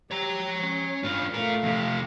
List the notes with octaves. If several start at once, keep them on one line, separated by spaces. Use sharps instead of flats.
G4 C#5 A#5
C#4
G2 F4
A3 F4 A#4 F5
F2 C3